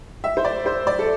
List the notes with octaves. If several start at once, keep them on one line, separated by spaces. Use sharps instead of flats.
E5
C5
D5
C5
D5
A4